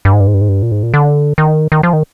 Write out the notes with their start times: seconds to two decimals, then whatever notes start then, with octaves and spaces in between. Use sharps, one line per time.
0.05 G2
0.13 G#2
0.20 G2
0.27 G#2
0.34 G2
0.41 G#2
0.49 G2
0.63 A#2
0.71 G#2
0.83 A#2
0.94 D3
1.38 D#3
1.72 D#3
1.83 F3
1.93 D#3